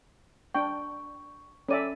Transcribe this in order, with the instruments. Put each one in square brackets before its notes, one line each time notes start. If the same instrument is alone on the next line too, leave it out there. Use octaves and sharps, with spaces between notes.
[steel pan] D4 G5 [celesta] C#6
[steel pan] C#4 D5 E5 [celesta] A4 D#7